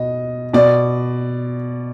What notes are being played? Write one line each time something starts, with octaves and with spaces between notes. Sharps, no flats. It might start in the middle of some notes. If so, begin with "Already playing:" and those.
Already playing: B2 D#5
B2 D5